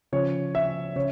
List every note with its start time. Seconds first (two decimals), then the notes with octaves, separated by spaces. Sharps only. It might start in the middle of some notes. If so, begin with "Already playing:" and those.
0.12 C#3 F3 C#5
0.55 E5
0.96 C#3 C#5